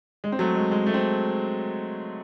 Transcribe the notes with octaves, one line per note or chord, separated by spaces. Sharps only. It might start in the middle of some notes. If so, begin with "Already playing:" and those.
G#3
C4
F#3 A3
G#3
G#3
A3
C4